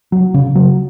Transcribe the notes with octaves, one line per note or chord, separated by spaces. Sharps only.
F#3
C#3
F#3